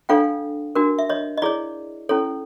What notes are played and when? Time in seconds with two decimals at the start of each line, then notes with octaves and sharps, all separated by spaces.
0.09 D4 F4 A4 C#5 F5 G5
0.75 D4 F#4 A#4
0.99 E5
1.09 C#5 D#5
1.38 D#5
1.42 E4 G#4 C#5 D5
2.09 C#4 E4 A4 C#5